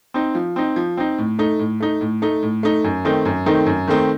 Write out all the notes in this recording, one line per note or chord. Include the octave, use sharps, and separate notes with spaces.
C4 D#4
F3
C4 D#4
F3
C4 D#4
A2
A3 D#4
A2
A3 D#4
A2
A3 D#4
A2
A3 D#4
F#2
D#3 A3 C4 D#4
F#2
D#3 A3 C4 D#4
F#2
D#3 A3 C4 D#4